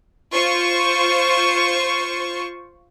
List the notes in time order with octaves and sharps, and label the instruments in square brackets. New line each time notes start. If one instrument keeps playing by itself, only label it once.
[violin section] F4 C5 C#6